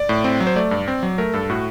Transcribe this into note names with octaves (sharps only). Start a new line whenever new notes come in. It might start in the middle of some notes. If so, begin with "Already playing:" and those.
Already playing: D5
A2
C4
F#3
C5
A3 D5
G2
C4
F#3
A3 A#4
G2 A4
A2 F#4